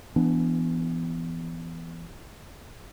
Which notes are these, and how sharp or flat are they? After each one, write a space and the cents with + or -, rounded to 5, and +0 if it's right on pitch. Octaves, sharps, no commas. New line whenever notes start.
E3 +30 B3 +10 D4 +0